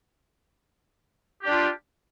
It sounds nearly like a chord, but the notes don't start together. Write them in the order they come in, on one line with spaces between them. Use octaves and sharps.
G4 D4 F4